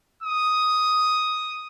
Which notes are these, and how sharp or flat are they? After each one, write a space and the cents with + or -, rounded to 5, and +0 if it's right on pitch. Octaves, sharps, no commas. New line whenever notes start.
D#6 +5